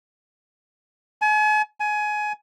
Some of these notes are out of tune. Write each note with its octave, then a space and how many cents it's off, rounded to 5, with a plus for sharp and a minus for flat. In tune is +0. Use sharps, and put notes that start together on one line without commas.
G#5 +40
G#5 +20